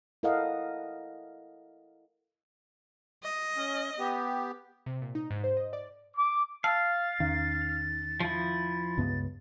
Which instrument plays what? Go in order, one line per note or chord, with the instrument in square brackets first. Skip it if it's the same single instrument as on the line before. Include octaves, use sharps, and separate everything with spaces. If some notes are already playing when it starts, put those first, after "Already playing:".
[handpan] E4 A4 A#4 D#5 F5 F#5
[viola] D#5
[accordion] C#4
B3 G4
[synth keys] C3
A#2
D#4
G#2
C5
D#5
D5
[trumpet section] D6
[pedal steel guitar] F5 [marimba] A5 E6 [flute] A6
[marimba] E2 [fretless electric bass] D#3
[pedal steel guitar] F3 E4
[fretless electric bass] C#2 G2 B3